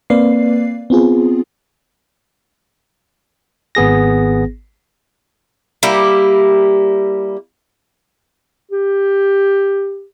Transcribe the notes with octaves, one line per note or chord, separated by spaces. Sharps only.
A#3 C4 B4 D5 F5 C7
B3 C4 F4 G#4
G#1 B3 G#4 A#6
G3 A#3 E4
G4